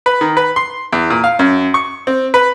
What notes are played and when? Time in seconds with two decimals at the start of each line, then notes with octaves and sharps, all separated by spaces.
0.06 B4
0.21 D#3
0.37 B4
0.56 C6
0.93 E2
1.10 A#2
1.24 F5
1.39 F#2
1.74 C#6
2.07 C4
2.34 B4